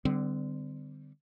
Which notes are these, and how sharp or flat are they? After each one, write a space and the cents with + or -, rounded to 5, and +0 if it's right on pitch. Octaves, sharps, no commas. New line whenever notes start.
D3 +10 G3 -5 C4 -40